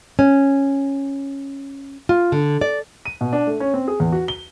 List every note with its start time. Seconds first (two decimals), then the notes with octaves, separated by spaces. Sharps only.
0.19 C#4
2.09 F4
2.32 D3
2.61 D5
3.05 D#7
3.21 B2
3.33 D4
3.47 A3
3.60 C#4
3.74 C4
3.88 G#4
4.00 E2
4.12 F#4
4.28 G7